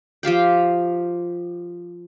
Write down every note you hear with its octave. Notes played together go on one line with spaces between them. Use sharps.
F3 G4 F5 G5